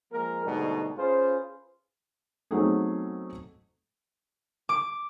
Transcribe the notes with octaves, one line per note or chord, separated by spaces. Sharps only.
F3 G#3 A#3 A#4
G#2 B2 D3 G3 A3 D#4
C#4 F4 G#4 B4 C5
F#3 A3 B3 C4 D#4 G#4
D6